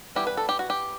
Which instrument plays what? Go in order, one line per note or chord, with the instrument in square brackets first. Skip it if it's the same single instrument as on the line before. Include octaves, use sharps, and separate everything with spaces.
[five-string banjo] E3 G3 B3 E4 G4
B4
A4
G4
F#4
G4